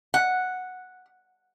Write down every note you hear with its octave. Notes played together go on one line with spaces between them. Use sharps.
F#5